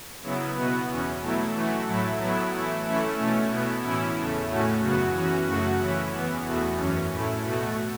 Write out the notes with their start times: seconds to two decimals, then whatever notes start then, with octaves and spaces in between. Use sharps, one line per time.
0.22 C#3 F#3 B3 E4
0.55 B2 B3 F#4
0.88 E2 E3 C#4
1.21 B2 F#3 A3 E4
1.53 E3 A3 F#4
1.86 A2 F#3 A3 E4
2.19 A2 F#3 B3 E4
2.52 E3 A3 E4
2.85 E3 A3 C#4 E4
3.17 B2 A3 C#4
3.51 B2 B3 E4
3.83 A2 E3 C#4 E4
4.16 E2 C#3 A3
4.49 A2 A3 C#4 F#4
4.81 F#2 C#3 F#3 B3 F#4
5.14 E3 C#4 F#4
5.47 F#2 C#3 A3 F#4
5.80 E3 C#4 E4
6.13 E2 E3 B3
6.45 E2 B2 A3 F#4
6.78 F#2 E3 C#4
7.11 A2 A3 E4
7.44 B2 A3 F#4